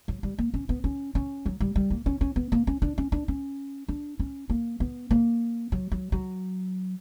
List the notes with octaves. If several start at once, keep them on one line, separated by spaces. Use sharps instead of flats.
F#3
G3
A#3
C#4
B3
C#4
C#4
F#3
G3
G3
A#3
C#4
C#4
B3
A#3
C#4
D4
C#4
D4
C#4
D4
C#4
A#3
B3
A#3
F#3
F#3
F#3